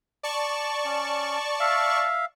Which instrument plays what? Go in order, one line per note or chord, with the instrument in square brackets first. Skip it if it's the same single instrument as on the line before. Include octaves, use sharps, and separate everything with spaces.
[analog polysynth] D5 A5 C#6
[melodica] C#4
E5 F5